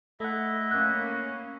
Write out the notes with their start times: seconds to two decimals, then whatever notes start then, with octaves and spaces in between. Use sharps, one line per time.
0.20 A3 E4 D#5 E5 F#5
0.71 A#3 C#4 F#6